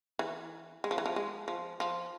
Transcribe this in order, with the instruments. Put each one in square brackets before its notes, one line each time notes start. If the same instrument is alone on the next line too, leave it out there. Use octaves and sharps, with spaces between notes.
[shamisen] E3
G#3
F3
E3
F3
G#3
F3
F3